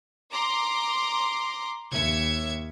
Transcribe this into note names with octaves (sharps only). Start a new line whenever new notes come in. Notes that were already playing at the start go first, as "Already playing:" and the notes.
A#5 C6 D6
D#2 E5 G#6 C#7